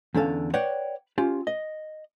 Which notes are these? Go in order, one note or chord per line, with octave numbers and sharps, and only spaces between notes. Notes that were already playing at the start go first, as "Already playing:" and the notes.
E2 D3 C#4 A4 F5
B4 C#5 D5 F#5 G5
C#4 F4 G4
D#5